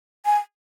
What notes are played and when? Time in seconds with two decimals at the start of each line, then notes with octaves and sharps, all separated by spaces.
0.26 G#5